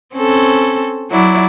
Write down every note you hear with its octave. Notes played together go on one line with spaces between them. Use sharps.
C4 C#4 A4
F#3 E4 D5